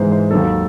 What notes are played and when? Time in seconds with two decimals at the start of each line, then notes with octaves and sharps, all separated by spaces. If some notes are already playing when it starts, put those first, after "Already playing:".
Already playing: G#2 E3 G#3 C5
0.12 C5
0.31 D#2 D#3 F#3 A4